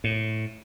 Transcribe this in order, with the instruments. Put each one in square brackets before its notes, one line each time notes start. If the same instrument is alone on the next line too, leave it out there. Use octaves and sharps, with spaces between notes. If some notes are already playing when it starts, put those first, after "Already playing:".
[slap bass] A2